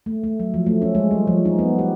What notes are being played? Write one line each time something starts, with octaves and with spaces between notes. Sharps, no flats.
A3
A3
F#3
F3
A3
C#4
G#3
G3
F3
D#4
B3
G4